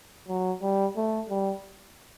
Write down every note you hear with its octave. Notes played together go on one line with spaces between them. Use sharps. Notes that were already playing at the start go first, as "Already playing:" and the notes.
F#3
G3
A3
G3